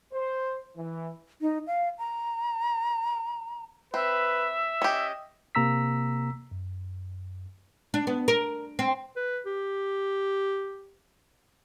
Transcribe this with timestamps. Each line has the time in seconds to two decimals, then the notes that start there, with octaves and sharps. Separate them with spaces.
0.13 C5
0.77 E3
1.41 D#4
1.67 F5
1.98 A#5
3.94 C4 B4 E5
4.82 C#4 G4 D#5
5.55 C3 A#3 A#5 E6 B6
6.51 F#2
7.94 D4
8.07 B3
8.28 A#4
8.79 C4
9.16 B4
9.46 G4